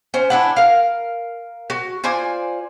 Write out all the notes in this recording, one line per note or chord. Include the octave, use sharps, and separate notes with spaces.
C#4 C5
D4 E4 F#5
A#4 F5
F#4
F4 C5 D5 G#5